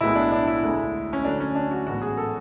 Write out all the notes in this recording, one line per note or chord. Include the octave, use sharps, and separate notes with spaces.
B1 A2 G#3 B3 E4
D4
D4
E4
D2 D3 G#3
C#4
D2 D3 F#3 D4
C#4
D4
F#4
A1 G#2 F#3 B3 F#4
G#4
A4